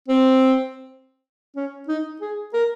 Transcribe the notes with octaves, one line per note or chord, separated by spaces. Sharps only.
C4
C#4
D#4
G#4
A#4